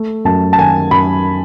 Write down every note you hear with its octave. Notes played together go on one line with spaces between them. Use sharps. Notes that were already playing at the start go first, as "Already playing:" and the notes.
Already playing: A3
F#2 A5
A5
D#3 G#5
F#2 B5